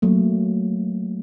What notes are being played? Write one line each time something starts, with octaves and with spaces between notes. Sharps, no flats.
F#3 A3 A#3